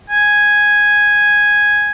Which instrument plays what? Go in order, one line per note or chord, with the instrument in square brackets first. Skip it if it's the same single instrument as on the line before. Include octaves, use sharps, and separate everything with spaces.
[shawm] G#5